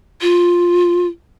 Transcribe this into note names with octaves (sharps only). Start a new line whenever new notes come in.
F4